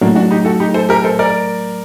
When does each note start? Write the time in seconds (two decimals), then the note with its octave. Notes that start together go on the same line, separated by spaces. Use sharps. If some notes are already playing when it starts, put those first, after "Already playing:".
0.01 A2 F#3 A3 A#3 D4
0.16 D4 F#4
0.31 D#4 G4
0.45 F#4 A4
0.60 D#4 G4
0.74 A4 C5
0.89 G4 A#4
1.03 A4 C5
1.19 A#4 D5